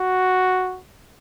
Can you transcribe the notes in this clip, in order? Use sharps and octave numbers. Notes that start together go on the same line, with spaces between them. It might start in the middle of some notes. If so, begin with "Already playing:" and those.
Already playing: F#4